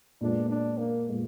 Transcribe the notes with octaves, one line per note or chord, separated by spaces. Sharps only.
A#2 G#3 B3 D4
D4
A#3
A#2 G#3 B3